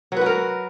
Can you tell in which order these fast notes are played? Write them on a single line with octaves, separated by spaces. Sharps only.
F#3 B4 F#4 A#4